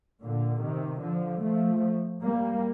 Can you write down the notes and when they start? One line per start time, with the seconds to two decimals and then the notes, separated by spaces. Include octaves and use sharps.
0.23 A#2 D3
0.63 C3 D#3
1.02 D3 F3
1.42 F3 A3
2.22 G3 A#3